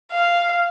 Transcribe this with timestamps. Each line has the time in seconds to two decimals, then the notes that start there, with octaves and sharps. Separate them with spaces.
0.12 F5